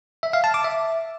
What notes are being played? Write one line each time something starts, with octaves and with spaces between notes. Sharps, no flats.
E5
F5
A5
D6
E5